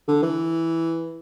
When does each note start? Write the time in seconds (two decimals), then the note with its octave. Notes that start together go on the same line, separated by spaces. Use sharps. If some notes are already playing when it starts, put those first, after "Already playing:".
0.08 D3
0.23 E3